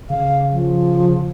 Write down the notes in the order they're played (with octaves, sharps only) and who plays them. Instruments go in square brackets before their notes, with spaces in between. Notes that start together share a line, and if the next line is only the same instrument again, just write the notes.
[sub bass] C#3 [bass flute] F5
[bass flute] F3